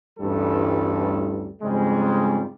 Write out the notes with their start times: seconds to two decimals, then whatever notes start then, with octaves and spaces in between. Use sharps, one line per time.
0.19 A1 D2 G2 E3 G3 A4
1.62 F2 G#2 C#3 G3 G#3